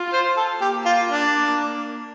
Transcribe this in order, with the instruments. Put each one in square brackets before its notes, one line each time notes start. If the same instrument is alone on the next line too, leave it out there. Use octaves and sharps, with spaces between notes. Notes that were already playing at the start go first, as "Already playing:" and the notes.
Already playing: [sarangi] F4
[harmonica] C5
A4
[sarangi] A#3 [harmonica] G4
[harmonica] F4
D4